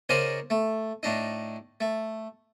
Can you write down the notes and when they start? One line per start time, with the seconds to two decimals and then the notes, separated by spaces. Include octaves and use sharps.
0.09 C#3 D#4 A#4 C5 D5 G#5
0.50 A3
1.03 A2 D4 D#4
1.80 A3